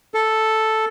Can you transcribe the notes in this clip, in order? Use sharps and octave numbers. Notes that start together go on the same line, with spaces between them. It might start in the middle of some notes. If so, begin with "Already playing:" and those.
A4